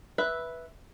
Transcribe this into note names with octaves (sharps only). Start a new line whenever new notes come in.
B4 E5